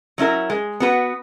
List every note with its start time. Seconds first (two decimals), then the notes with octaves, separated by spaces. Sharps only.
0.18 F#3 C#4 E4 A#4
0.50 G#3
0.80 B3 F#4 B4